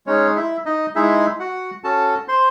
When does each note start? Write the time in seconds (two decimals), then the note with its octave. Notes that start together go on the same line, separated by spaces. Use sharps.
0.07 G#3 C#4 D#4 G#4 C#5
0.36 E4 E5
0.66 D#4 D#5
0.95 G#3 D#4 E4 G#4 E5
1.40 F#4 F#5
1.84 C#4 F#4 A4 A5
2.28 C5 C6